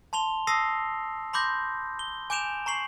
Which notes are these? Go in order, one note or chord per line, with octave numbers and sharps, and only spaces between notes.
A5 C6 F7 G7
A5 D#6 E6 A#6 C7
B5 C6 D6 G6 A#6
G7
G#5 D6 G6 D7 E7 F7
A#5 C#6 C7 F#7